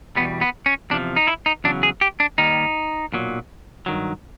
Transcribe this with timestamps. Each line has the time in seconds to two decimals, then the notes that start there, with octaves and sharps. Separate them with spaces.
0.16 E2 B2 G3 B3
0.41 B3
0.66 C#4
0.91 E2 C3 F3 D4
1.16 D#4
1.27 E4
1.46 D#4
1.64 E2 C#3 F#3 D4
1.83 G#4
2.01 G4
2.20 D4
2.38 D#2 D#3 G3 D#4
3.12 B1 A#2 F#3
3.86 G2 D#3 F#3